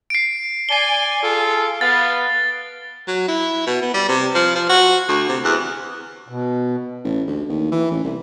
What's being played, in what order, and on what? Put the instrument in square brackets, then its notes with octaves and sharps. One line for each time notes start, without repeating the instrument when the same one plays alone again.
[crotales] C7 D7
[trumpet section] D5 G#5 [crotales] C7 G7
[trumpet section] F4 G#4 A4
[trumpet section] B3 B4 F5 [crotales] A6
[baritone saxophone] F#3
E4
B2
B3
G3
C3
F3
F3
F#4
D2
C3
E2
[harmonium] B2
[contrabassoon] A1
D2
D#2
E3
A1
C2